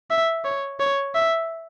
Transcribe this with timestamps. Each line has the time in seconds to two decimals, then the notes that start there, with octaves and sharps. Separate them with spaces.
0.11 E5
0.45 C#5
0.80 C#5
1.15 E5